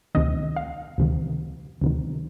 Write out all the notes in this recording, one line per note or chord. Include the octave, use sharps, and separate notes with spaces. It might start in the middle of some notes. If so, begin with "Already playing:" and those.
D2 C3 D#3 D#5
F5
D2 C3 D#3
D2 C3 D#3